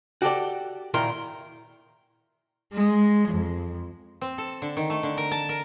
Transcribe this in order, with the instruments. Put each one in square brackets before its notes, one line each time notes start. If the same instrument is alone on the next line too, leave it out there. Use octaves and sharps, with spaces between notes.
[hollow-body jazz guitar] F#4 G4 A4 D5
A#2 D#3 E4 A#4 C6
[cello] G#3
F2
[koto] C4
A4
D3
D#3
A3
D3
A#4
A5
A#4